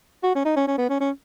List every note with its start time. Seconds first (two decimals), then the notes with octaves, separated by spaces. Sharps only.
0.23 F#4
0.35 C#4
0.45 D#4
0.57 C#4
0.67 C#4
0.78 B3
0.89 C#4
1.00 C#4